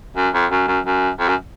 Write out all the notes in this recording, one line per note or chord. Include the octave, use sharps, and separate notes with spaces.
F#2
F2
F#2
F#2
F#2
F2
F#2